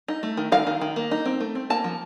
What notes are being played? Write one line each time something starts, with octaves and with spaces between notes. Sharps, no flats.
D#4
A3
D#3
D#3 F5
D#3
D#3
A#3
D#4
C4
A3
C4
A#3 A5
F3